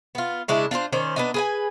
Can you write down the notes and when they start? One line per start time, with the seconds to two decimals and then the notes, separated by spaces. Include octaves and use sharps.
0.15 B3 F4
0.48 C#3 G#3 D4 E4
0.71 D4 F4 A#4 C5
0.93 D#3 C#4 C5 D5
1.16 B3 D4 D#4
1.34 G#4 B4 G#5